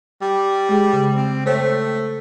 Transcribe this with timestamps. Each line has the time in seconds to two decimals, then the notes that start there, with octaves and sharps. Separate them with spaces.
0.21 G3
0.69 G#3 G#4
0.93 C#3
1.16 C4
1.46 A3 C5 C#5 G5